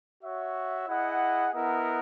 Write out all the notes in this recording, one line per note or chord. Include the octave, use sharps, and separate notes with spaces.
F#4 C#5 E5
E4 G#4 D#5 F#5
B3 E4 A#4 D#5 F#5